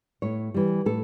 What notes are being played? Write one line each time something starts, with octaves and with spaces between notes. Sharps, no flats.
A2 C#5
E3 G3
A2 A4